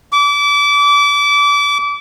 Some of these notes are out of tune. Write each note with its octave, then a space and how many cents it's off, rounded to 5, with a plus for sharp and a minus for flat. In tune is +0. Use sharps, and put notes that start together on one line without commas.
D6 -30